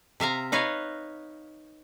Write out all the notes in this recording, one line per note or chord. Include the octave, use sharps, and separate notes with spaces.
C3 E5 F5 A#5
D#4 B4 C#5 D#5 F5